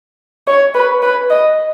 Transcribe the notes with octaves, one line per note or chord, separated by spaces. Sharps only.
C#5
B4
B4
D#5